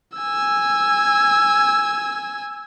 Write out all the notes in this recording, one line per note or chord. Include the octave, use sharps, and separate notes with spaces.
G#5 E6